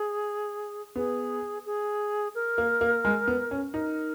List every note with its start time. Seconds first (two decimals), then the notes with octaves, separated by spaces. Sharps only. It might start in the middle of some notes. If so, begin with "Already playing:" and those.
Already playing: G#4
0.96 B3 G#4
1.66 G#4
2.35 A#4
2.58 A#3
2.81 A#3
3.05 G#3
3.27 B3
3.51 C#4
3.74 D#4 A#4